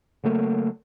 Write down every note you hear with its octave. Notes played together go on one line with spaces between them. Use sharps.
C#3 F#3 A3 A#3